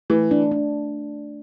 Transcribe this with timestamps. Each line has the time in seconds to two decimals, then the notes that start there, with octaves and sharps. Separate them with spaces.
0.10 E3 A3
0.31 D4
0.51 D4